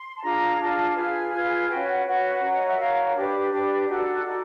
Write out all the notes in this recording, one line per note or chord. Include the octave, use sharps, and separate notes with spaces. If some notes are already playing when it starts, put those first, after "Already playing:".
Already playing: C6
A5
D4 F4 G#4 A#5
D4 F4 G#4 A5
A5
F4 G#4 B4 G#5
F4 G#4 B4
C#4 F#4 B4 G5
F#5
C#4 F#4 B4 F#5
F#4 A#4 C#5
D#5
E5
F#4 A#4 C#5 F5
D4 G4 B4 D5
D4 G4 B4
D#4 F#4 A4 D5
D#4 F#4 A4